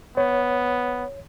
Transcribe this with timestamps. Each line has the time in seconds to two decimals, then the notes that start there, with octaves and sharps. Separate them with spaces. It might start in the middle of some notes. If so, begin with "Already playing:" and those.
0.17 B3 C#5